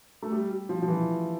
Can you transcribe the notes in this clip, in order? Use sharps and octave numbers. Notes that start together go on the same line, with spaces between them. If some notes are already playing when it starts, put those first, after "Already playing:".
A3
G3
G3
F3
F3
E3